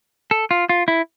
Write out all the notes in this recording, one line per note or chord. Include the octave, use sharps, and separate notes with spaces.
A4
F4
F4
E4